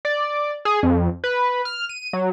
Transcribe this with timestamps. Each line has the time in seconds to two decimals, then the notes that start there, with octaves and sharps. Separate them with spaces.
0.05 D5
0.65 G#4
0.83 F2
1.24 B4
1.65 F6
1.89 D#7
2.13 F#3